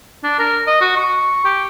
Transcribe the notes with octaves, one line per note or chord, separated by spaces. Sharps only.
D4
A#4
D#5
F#4
C#6
G4